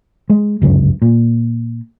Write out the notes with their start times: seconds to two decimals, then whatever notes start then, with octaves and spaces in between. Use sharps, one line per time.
0.30 G#3
0.62 G1 C#2 F#2
1.02 A#2